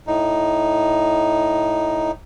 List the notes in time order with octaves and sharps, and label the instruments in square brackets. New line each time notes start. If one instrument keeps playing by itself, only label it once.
[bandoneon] A2 D#4